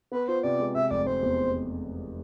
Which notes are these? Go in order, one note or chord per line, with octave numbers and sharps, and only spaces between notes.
B3 B4
F4 C5
C3 D5
G#3
C3 E5
F1 D5
F1 C5
E2